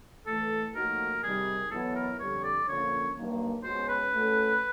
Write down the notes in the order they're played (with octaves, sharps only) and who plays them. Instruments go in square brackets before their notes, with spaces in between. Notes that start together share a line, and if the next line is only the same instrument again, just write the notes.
[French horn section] A2 E3 A3 [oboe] A4
[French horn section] A2 F3 A#3 D#4 F#4 [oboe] A#4
[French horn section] C3 D#3 G3 [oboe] G#4
[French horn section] E2 B2 F#3 B3 E4 [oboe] A4
[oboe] A#4
[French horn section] F2 D3 G3 [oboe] C#5
[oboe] D5
[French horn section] D3 F3 A#3 C#4 [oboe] C#5
[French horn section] G2 D#3 F#3 A#3
[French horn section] B2 G#3 C#4 F#4 [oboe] C5
[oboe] B4
[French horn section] A3 C#4 F#4 A4